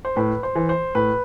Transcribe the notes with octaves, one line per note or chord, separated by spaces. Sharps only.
C5
A2 B4
C5
E3
C5
A2 B4